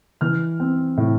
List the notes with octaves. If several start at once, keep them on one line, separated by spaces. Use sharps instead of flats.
E3 F6
C4
A2